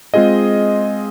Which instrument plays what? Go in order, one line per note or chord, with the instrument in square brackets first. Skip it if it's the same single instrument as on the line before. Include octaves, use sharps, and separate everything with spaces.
[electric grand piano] G#3 C4 F4 G#4 D#5